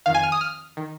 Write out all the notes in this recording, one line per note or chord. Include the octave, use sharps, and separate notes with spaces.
F2 D#3 F5
G#5
F6
D#6
F6
D#3